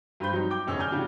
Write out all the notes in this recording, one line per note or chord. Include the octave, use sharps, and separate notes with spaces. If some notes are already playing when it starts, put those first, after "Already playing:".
G2 G4 C5 B5 G6
F#3 G3 C4 D#4 G4
G5 D6 G6 G7
F1 D2 C#4 G#4 E6
D5 G#5 F6 G6
A2 C#3 D4 E4 F#4 G4